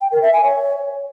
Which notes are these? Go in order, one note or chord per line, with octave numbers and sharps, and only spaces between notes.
G5
A#4
E5
G#5
C#5